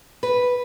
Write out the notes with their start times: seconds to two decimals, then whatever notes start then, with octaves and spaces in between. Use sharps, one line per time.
0.23 B4